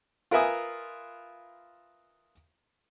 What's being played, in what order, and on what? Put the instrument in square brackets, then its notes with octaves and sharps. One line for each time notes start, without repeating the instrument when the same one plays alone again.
[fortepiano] F4 A#4 B4 E5 G#5 D#6